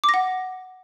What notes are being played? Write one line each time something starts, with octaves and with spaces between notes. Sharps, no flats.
D6
A#6
F#5